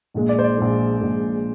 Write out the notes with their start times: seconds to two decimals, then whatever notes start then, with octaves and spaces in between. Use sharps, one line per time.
0.14 A#1 A#2 G#3
0.29 D5
0.39 C5
0.44 D5
0.58 A#1 A#2 G#3
1.01 A#1 A#2 G#3